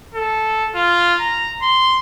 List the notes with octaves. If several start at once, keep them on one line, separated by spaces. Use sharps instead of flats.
A4
F4
A#5
C6